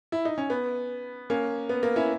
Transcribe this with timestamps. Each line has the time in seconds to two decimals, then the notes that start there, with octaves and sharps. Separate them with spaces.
0.12 E4
0.25 D#4
0.38 C#4
0.50 B3
1.30 A#3 C#4
1.69 B3
1.83 A#3
1.96 C#4 E4